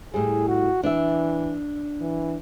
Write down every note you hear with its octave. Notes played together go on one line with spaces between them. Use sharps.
A2 G3 G#4
F#4
E3 D4 D5 E5
E3